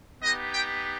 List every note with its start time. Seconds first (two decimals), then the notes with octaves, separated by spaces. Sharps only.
0.22 B3 D#4 G4 D#5
0.51 G5